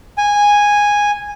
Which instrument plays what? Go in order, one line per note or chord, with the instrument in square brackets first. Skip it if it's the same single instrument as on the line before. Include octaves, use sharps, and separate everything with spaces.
[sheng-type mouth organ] G#5